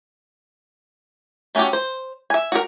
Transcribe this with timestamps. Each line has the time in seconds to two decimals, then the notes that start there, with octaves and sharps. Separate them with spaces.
1.55 A3 C#4 E4 F#4 G4
1.73 C5
2.30 E5 G#5
2.52 F#4 G#4 A#4